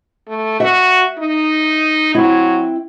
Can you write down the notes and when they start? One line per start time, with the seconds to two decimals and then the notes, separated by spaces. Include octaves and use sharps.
0.27 A3
0.60 F#4 E5
1.19 D#4
2.15 F#3 C4 E4